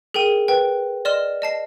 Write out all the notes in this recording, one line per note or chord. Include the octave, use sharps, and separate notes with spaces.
G#4 A#4 G5 D#7
B4 G5
D5 D#5 C6 F6 E7
D#5 A5 C7